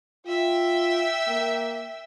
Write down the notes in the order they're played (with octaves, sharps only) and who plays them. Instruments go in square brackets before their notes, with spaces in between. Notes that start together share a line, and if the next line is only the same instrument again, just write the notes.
[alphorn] F4 [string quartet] E5 G5
[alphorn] A#3